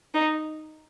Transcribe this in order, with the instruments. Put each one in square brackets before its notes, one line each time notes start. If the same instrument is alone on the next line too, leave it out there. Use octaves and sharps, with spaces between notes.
[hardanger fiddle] D#4